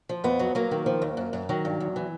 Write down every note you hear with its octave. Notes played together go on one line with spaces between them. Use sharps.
F3
F2 B3
F#3
F#3 A#3
D#3
F3
D#2
F#2
F#2
D#3 F#3
G2
E2
E3